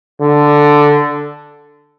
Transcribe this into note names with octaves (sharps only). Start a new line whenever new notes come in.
D3